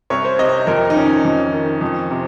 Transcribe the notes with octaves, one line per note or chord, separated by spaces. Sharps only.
C2 C#5
C5
C3 D#5
F2 A#4
D#4
D#3 C#4
F2
D#3
F2
C3